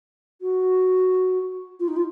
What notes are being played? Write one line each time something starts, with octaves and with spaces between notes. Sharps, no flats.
F#4
F4
D#4
F4